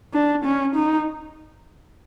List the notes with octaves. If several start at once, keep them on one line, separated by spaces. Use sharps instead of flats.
D4
C#4
D#4